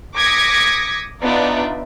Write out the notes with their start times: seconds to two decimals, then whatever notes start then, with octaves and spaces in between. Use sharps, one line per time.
0.15 D6 D#6 G#6 A#6 B6 C#7
1.22 B3 D4 D#4 F4 D5 E5